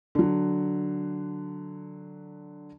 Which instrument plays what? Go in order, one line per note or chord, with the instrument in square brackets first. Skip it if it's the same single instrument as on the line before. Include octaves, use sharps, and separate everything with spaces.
[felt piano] D3 F#3